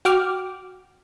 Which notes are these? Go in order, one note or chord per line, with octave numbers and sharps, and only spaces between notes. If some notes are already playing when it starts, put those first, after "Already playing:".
F#4 G5 D6 F6